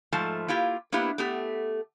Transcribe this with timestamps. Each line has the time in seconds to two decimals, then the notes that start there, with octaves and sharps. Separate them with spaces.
0.12 G#2 F3 A3 A5
0.48 A#3 E4 F4 G4
0.92 A#3 B3 D4 E4 G4
1.18 A3 B3 G4